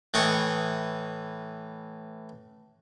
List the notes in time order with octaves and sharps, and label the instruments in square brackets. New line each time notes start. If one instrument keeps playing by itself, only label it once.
[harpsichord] A2 E3 D#5 G5 C#6